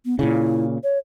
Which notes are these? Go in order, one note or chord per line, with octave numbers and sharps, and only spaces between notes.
B3
A#2 C#3 E4
C#5